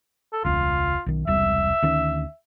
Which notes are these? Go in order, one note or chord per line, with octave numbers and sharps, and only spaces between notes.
A4
E1 C#2 F4
B1 D#3
E1 C2 G3 E5
D2 D#3 C#4